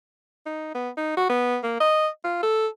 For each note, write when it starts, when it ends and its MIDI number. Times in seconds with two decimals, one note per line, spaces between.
0.46 0.74 63
0.75 0.90 59
0.97 1.16 63
1.17 1.29 66
1.30 1.58 59
1.64 1.79 58
1.80 2.08 75
2.24 2.38 65
2.43 2.67 69